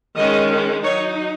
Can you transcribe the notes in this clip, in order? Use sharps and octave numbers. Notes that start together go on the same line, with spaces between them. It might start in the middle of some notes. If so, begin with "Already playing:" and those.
D#3 G#3 C#4 D#5
F#3 D#4 C#5